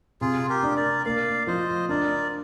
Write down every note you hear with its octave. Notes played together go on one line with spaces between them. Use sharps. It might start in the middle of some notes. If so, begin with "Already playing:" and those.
C3 F4 G#4
G4 A#4
D4
A#4 D5
A#3 D5 F5
F3 C5 D#5
D4 A#4 D5